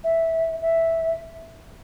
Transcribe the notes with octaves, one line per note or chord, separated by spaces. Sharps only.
E5
E5